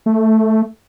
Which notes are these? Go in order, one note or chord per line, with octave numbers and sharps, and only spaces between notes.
A3